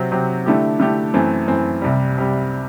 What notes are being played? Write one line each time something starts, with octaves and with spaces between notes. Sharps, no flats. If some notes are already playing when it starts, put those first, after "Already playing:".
Already playing: C3 F#3 C4
C3 F#3 C4
D3 A3 E4 G4
D3 A3 E4 G4
F#2 E3 A3 C4
F#2 E3 A3 C4
C2 C3 G3
C3 G3